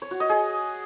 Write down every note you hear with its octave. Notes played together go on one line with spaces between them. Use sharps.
C#5
F#4
D#5
G#4